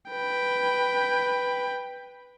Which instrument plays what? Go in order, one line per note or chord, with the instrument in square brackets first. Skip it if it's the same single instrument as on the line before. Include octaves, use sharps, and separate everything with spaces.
[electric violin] B4 G5